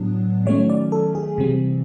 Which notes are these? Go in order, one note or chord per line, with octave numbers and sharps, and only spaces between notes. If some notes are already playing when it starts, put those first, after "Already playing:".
Already playing: A2 F#3 B3 D4
D#3 F#3 A3 C#4 C#5
D5
A4
G#4
C3 E3 G3 C4